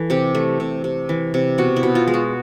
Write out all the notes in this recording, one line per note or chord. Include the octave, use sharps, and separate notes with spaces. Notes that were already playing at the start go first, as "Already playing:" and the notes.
Already playing: E3 A4
C3 G4
A3
C3
C3
E3
C3
B2 F#4
E4
B2
F4
G#3
F#4